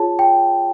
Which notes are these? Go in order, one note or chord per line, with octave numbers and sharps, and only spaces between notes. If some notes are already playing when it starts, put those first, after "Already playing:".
Already playing: F4 G#4 C#5 A5
G5